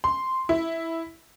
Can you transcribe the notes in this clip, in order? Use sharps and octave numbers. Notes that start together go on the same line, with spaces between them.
C6
E4